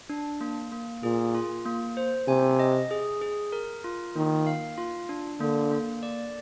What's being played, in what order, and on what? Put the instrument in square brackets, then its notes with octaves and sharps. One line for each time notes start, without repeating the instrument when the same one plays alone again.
[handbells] D4
A#3
A#3
[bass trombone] A#2 [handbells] G#4
[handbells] F4
A#3
C5
[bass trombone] C3 [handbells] G#5
[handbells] D#5
G#4
G#4
A#4
F4
[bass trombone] D#3 [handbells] A#3
[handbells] F5
F4
D4
[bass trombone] D3 [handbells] A#3
[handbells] A#3
D5